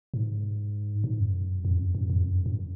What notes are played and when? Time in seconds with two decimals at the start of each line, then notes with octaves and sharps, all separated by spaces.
0.14 G#2
1.04 G#2
1.19 F#2
1.65 F2
1.79 F#2
1.95 F#2
2.10 F2
2.25 F#2
2.46 F#2